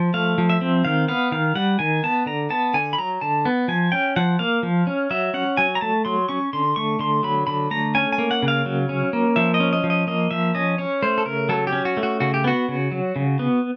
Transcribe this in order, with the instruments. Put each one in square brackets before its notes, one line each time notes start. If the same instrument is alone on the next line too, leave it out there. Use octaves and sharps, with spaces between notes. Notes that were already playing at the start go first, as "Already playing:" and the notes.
Already playing: [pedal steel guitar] F3
A3 F5
F3
E5
C4
D#3 F5
B3 F5
D#3 F5
G3 F#5
D#3 G#5
B3 A5
D3 A#5
B3 A5
D3 G#5
B5
F#3 A#5
D3 A5
B3
F3 G#5
C#4 G5
F3 F#5
A#3 F5
F3
C#4
F#3 E5
C#4 F#5
F#3 G#5
A#5
A3 A5
F#3 C6
C#4 C#6
D3 C6
A3 C#6
D3 C6
F#3 B5
D3 B5
A3 A#5
C#4 G#5
G#5
A#3
F#5
C#3
F5
F#3
C#4
A#3
F3 E5
D#5
C#4
D#5
F3
D#5
A#3 D#5
F3 E5
C#4 D#5
C#4 C#5
A3 C5
A4
C#3 A#4
F#3 A4
G4
C#4
F#4
A3
F#4
C#3 F#4
G4
B3 F#4
C#3
F#3
C#3
B3